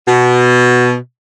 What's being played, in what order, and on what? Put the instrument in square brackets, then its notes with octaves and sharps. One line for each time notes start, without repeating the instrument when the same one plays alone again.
[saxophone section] B2